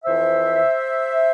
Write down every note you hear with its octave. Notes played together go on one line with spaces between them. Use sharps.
F2 E3 C5 E5